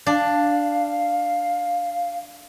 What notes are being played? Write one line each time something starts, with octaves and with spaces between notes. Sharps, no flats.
D4 F5